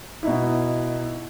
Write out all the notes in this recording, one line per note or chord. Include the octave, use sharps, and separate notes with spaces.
B2 D#4 E4